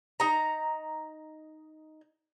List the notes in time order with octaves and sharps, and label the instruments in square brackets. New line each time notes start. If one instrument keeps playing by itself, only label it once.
[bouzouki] D#4 A#5